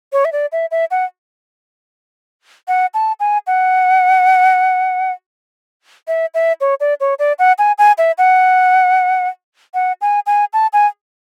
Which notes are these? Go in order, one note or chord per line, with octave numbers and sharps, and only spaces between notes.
C#5
E5
D5
E5
E5
F#5
F#5
A5
G#5
F#5
E5
E5
C#5
D5
C#5
D5
F#5
G#5
G#5
E5
F#5
F#5
G#5
G#5
A5
G#5